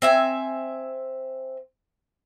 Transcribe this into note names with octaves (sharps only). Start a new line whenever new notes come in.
C4 E5 G#5